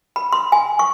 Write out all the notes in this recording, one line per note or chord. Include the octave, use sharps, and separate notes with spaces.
B5
C6
G#5
C#6